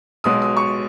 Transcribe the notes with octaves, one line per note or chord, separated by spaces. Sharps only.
B1 B2 G#3 D#6
D#6
C#6